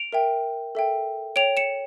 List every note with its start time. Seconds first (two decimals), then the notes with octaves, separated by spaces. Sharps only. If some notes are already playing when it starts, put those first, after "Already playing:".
Already playing: D7 F7
0.13 A#4 E5 G5
0.75 A4 E5 G5
1.36 C#5 G5 D7 F7
1.57 C#7 E7